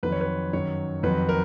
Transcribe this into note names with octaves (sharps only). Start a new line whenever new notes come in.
F2 D#3 F#3 B4
C#5
B4
F#2 D#3 F#3 C#5
F2 D#3 F#3 B4
A#4